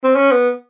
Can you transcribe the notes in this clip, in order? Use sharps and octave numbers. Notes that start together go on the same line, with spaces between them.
C4
C#4
B3